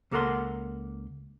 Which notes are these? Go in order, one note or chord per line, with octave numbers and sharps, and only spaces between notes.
C#2 A#3 A4 A#4 F#5 C6